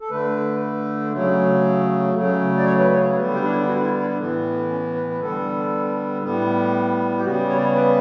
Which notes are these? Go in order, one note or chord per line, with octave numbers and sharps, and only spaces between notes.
A4
D3 A3 B4
C#3 F#3 A3
C#3 F#3 A3
D5
C#5
B4
C#5
D3 G3 B3 B4
G4
D4
E4
F#4
E4
D4
A2 E3 B3
C#4
B4
B4
D3 G3 B3 A4
A2 G3 B3
G4
C#3 G3 B3 F#4
C#5
D5
C#5
B4